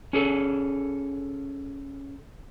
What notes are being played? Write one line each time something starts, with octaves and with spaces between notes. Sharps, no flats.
C#4 G#4 A4